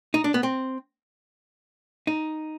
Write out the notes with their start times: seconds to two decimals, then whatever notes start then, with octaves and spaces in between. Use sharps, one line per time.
0.14 D#4
0.24 D4
0.34 B3
0.43 C4
2.07 D#4